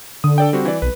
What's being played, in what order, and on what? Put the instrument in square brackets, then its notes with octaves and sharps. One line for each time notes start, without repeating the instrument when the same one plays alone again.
[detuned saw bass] D3 [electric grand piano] D#6
[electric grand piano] A4 D5 G5
G3 C4 F#4
E3 D5
[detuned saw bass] B1 [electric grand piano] B4